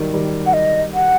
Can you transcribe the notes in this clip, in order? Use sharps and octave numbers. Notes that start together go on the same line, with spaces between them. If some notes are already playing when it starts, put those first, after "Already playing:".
Already playing: D#3 F#3 G3
D#3 G3
F#5
D#5
F#5